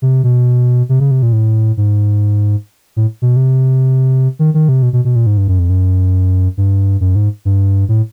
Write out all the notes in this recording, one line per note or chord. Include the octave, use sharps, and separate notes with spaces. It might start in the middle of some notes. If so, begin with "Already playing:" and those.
C3
B2
C3
C#3
C3
A#2
A2
G#2
A2
B2
C3
D#3
D#3
C3
B2
B2
B2
A#2
G#2
G2
F#2
F2
F#2
G2
F#2
G#2
G2
A2